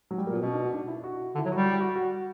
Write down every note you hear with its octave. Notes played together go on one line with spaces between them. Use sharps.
F#3
G3
A#3
A#2 B3
B2 C#4
D4
F#4
D4
E4
F#4
D3
E4
F#3
G3 F#4
G4
F#4
F#4